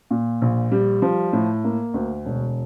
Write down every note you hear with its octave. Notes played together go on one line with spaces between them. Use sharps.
A#2
A#1
G3
F3
A2
A#3
D2
E1